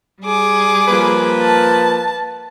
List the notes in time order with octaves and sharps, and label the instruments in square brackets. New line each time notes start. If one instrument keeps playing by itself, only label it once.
[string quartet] G3 G#4 D6
[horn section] F3 A#3 B4
[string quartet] A5